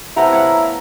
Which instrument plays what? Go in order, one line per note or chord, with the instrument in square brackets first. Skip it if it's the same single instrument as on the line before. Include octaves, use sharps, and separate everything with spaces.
[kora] C3 A3 B3 [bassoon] E4 [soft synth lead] A#5
[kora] C#5 F5 F#5